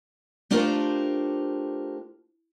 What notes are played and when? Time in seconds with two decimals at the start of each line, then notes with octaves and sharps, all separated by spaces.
0.51 A3 D4 F4 G4 A#4 C5